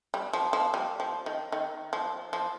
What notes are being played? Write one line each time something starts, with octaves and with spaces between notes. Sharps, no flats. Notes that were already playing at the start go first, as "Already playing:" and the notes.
G3
F3
F3
G3
F3
D#3
D#3
F3
F3